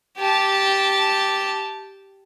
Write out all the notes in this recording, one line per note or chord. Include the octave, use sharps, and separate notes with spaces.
G4 A5